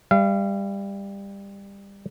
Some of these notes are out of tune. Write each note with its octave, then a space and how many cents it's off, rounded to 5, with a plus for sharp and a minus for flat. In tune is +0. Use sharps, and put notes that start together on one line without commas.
G3 +20 F5 -35